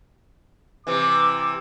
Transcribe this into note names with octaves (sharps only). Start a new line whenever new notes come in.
C3 E3 D6